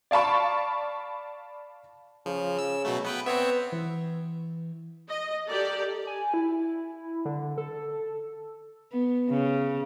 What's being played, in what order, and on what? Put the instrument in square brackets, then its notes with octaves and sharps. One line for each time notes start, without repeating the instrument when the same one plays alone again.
[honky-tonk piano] D5 F5 A5 B5 C#6
[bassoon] C#3 [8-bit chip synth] F3
[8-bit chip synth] E6
B2 F#3 A3
B3 B4 G5
[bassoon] B3 [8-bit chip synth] C4 C#5 E5
[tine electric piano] E3
[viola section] D#5
G4 A4 A#4 D5
[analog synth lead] G#5
E4
D3
A4
[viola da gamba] B3
C#3